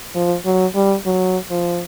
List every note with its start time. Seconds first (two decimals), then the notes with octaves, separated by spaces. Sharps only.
0.15 F3
0.45 F#3
0.75 G3
1.06 F#3
1.51 F3